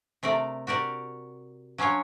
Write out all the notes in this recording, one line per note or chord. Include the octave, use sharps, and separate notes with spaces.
C3 A3 A#4 D5
F#4 G4 A#4 D5
F#3 C#4 D4 F4 C#5